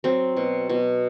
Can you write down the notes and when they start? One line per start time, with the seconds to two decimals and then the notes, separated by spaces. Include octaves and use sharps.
0.04 F#3 C4
0.37 B2
0.69 B2